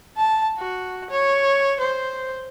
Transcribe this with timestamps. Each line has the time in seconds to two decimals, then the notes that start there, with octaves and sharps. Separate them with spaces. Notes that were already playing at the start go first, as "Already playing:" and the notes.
0.17 A5
0.58 F#4
1.10 C#5
1.80 C5